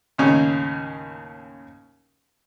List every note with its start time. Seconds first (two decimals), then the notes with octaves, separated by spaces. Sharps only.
0.18 D#2 A2 C#3 C#4 D#4